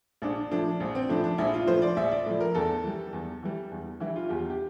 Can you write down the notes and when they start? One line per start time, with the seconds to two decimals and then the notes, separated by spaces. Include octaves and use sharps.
0.22 A#1 D4
0.51 A2 F3 D4
0.80 A#1
0.95 C4
1.09 A2 F3 D4
1.24 D4
1.38 A#1 E4
1.54 F4
1.67 A2 F3 C5
1.82 D5
1.97 A#1 E5
2.12 D5
2.26 A2 F3
2.40 A#4
2.55 E2 A4
2.84 E3 G3
3.13 E2
3.43 E3 G3
3.72 E2
4.00 E3 G3 E4
4.16 F4
4.29 E2 G4
4.50 G4